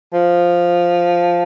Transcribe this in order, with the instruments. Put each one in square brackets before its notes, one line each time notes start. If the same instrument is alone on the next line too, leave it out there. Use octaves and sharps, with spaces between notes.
[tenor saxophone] F3